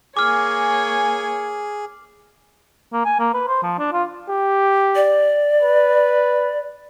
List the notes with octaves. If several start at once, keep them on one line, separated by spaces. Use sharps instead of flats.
A#3 G#4 C#5 G#5 D6 F6
A#3
G#5
A#3
B4
C5
F3
D4
F4
G4
D5
B4